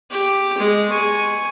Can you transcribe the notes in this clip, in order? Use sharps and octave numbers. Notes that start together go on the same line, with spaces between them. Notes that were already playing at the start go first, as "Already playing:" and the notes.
G4
G#3
G#5 C#6